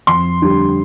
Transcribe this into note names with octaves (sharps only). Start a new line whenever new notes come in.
F2 C6
D3 G3